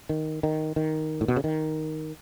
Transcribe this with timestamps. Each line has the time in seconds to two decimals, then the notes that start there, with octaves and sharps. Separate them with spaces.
0.09 D#3
0.43 D#3
0.76 D#3
1.21 A2
1.28 B2
1.36 C#3
1.44 D#3